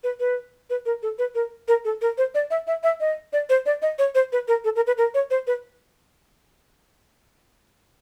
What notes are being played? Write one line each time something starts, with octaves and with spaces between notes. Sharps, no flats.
B4
B4
B4
A#4
A4
B4
A#4
A#4
A4
A#4
C5
D5
E5
E5
E5
D#5
D5
C5
D5
D#5
C#5
C5
B4
A#4
A4
A#4
B4
A#4
C#5
C5
B4